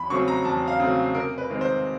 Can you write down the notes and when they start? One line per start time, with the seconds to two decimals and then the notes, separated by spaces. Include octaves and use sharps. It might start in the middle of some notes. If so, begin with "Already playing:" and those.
Already playing: E2 B5
0.10 C#3 F#3 A3 C4 C#6
0.28 A#5
0.45 E2 A5
0.68 F5
0.80 C#3 F#3 A3 C4
1.15 C3 A#4
1.38 B4
1.49 D#3 G#3 C4
1.61 C5